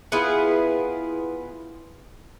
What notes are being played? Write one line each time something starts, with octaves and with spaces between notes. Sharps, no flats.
B3 E4 F4 G#4